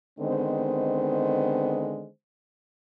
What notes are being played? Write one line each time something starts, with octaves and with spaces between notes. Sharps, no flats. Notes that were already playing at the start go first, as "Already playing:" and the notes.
D3 D#3 G#3 B3 C4 C5